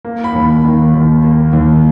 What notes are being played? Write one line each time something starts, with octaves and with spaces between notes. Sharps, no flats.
A#3
B5
D#2
D#3
D#2
A#3
D#2